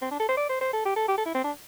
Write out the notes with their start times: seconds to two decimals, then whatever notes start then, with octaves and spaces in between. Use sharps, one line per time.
0.02 C4
0.11 D4
0.20 A4
0.29 C5
0.37 D5
0.49 C5
0.61 C5
0.73 A4
0.85 G4
0.96 A4
1.08 G4
1.18 A4
1.26 E4
1.34 C4
1.44 D4